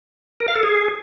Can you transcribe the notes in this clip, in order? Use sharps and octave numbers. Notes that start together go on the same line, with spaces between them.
A#4
F5
A4
G#4